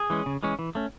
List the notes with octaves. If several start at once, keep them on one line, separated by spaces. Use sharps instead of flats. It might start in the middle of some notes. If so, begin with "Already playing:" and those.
Already playing: G#4
E3 G#3 C#4
C#3
E3 G#3 C#4
E3
A3 C#4